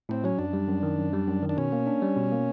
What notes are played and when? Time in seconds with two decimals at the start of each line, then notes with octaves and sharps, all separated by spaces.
0.09 A2 C4
0.24 F#3 C#4
0.38 F#2 D4
0.53 G3
0.68 F#2
0.83 D#3
0.98 F#2
1.13 G3
1.27 F#2
1.42 D#3
1.49 D4
1.57 B2 C#4
1.72 A#3
1.87 D4
2.02 G3
2.16 B2
2.32 A#3